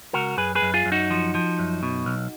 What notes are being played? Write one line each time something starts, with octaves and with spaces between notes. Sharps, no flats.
C#2 F#4 A#4
F#2 G#4 B4
G#4 B4
F#2
F4 G#4
F#2
D#4 F#4
F3
F3
F#2
B2
B1